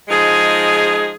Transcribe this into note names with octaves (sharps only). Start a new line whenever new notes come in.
F3 G#3 D#4 G#4